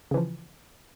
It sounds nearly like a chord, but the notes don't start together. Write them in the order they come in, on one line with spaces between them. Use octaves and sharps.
C#3 E3 F3